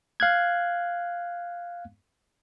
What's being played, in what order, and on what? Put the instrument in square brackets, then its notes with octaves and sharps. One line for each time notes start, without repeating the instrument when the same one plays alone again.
[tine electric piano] F5 F#6 G#6